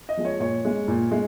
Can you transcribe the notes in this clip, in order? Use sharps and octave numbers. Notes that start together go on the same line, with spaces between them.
D#5
F3 G#3
C#5
A#2 C#5
G#3
A#2
G#3